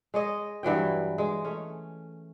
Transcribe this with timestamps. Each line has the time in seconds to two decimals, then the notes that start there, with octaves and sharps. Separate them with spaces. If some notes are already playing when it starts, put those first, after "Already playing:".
0.14 G#3 C#5 D#5
0.63 G2 E3 F#3 G5
1.18 G#3
1.44 A3 C#4